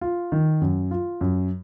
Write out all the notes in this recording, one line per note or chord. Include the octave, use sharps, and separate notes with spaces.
F4
D#3
F#2
F4
F#2